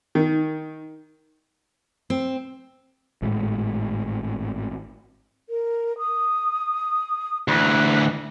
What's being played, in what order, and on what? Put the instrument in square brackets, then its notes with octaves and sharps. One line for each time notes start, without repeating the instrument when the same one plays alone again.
[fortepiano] D#3
[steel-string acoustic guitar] C4
[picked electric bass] G#1 A2 G#3
[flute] A#4
D#6
[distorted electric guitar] D2 E3 [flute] F#6